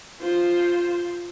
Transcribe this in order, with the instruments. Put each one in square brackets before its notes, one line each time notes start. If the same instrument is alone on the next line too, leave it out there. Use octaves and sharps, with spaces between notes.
[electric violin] F4 C5